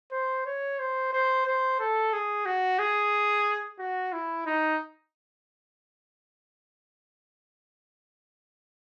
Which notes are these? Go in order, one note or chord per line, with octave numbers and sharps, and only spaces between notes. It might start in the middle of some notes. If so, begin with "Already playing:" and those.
C5
C#5
C5
C5
C5
A4
G#4
F#4
G#4
F#4
E4
D#4